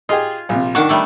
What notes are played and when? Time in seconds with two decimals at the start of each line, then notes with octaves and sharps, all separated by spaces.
0.09 F4 G4 G#4 D#5
0.49 A#1 C3
0.75 D#3 D4 A#4 F#5 A5 C#6
0.89 G3 A3 B3